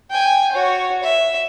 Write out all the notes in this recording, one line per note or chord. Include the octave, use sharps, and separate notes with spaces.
G5 G#5
F#4 C#5
E5